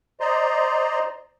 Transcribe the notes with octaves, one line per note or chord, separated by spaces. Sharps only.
C5 D5 D#5 A#5 C6